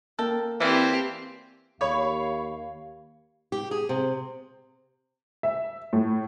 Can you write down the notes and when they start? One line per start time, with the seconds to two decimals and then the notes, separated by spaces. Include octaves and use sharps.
0.19 A#3 A4 G5
0.60 E3 C4 D4 G4 F5
1.81 D#2 C#5 F5 B5
3.52 G4
3.71 G#4
3.89 C3
5.43 E5
5.93 A2